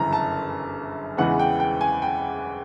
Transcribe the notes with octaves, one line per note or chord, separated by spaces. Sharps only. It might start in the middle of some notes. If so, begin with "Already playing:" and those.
Already playing: G1 F#2 C#3 E3 A#5
A5
E2 C#3 E3 G#3 B3 F#5
G5
G5
G#5
G5